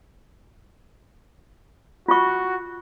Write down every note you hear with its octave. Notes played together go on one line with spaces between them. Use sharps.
F4 F#4 C#6